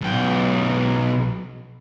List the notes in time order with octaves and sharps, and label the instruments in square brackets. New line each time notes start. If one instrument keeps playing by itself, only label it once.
[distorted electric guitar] B1 G5